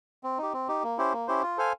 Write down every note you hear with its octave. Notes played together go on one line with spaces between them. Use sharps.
C4
D#4 G4
C4
D#4 G4
A#3
C#4 E4 G4 C5
A#3
C#4 E4 G4 C5
F4
A4 C5 F5 G#5